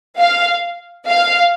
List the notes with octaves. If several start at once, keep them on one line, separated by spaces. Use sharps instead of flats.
F5
F5